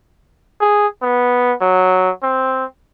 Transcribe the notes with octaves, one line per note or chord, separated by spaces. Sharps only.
G#4
B3
F#3
C4